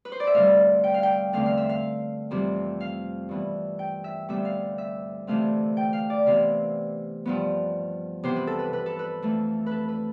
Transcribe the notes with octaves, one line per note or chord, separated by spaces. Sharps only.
B4
C5
D5
E5
D2 C3 G3 F5
G5
F5
G5
E2 D3 A3 C4 F5
F5
E5
F5
F2 C3 E3 G3 C4
F5
G2 E3 B3
G5
E5
D2 C3 G3 B3 E5
F5
E5
D2 C3 E3 A3 C4 F5
G5
F5
D5
C3 E3 B3 F5
G2 F3 B3
C3 E3 B3 C5
B4
A4
B4
B4
A4
B4
F2 E3 A3
B4
A4
B4